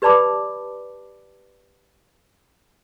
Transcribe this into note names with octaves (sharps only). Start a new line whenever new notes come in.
G4 B4 D5 A5 B5 D6